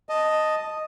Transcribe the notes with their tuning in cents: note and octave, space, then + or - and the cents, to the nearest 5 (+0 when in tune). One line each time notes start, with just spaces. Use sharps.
D#5 +0 A5 +0